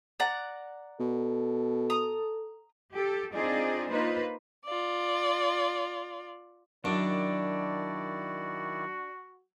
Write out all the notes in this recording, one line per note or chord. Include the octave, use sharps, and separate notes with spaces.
D5 F#5 A#5
B2 A4
A#5 D#6
G4 A4
C4 D4 D#4 F4 G#4 D5
A#3 D#4 F4 B4 C5
F4 D5
F#2 D#3 D4 E4 F#4 D5